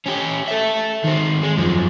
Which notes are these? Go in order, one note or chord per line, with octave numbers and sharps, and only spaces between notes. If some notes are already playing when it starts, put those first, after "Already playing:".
C#4 G4
A4 E5
D#3 C4
G#3
F#2 F3